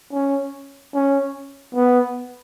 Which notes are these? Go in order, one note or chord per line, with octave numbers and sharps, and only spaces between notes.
C#4
C#4
B3